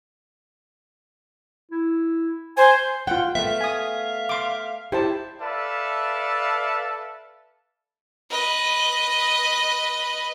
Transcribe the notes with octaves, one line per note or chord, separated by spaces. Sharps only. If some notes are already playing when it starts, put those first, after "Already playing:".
E4
C5 G#5
F4 F#5 G5
A3 B3 E5 F5
G#5 D#6
C6 D6
E4 G4 C5 A5
A4 B4 D5 E5 F5 A5
B4 D#5